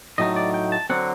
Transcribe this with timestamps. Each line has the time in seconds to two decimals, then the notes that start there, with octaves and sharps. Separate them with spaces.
0.18 A2 F#3 A3 D#4 D#5
0.36 D5
0.54 G5
0.72 A5
0.90 D3 F#3 C4 F#5